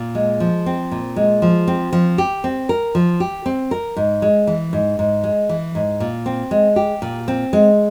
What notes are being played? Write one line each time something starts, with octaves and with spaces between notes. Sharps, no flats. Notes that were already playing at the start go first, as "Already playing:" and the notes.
Already playing: A#2
G#3
F3
C4
A#2
G#3
F3
C4
F3
G4
C4
A#4
F3
G4
C4
A#4
G#2
G#3
E3
G#2
G#2
G#3
E3
G#2
A#2
C4
G#3
G4
A#2
C4
G#3